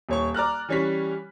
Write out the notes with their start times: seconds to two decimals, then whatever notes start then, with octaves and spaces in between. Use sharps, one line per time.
0.09 D#1 C#5 C#6
0.34 D5 A#5 F6 F#6
0.69 E3 G3 C#4 C#5 B6